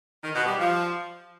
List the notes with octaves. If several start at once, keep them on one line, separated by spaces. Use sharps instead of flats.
D#3
B2
G3
F3